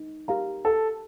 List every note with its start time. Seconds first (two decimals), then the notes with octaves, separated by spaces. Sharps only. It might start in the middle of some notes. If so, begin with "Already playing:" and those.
Already playing: D#4
0.28 G4 A#4 F5 A#5
0.65 A4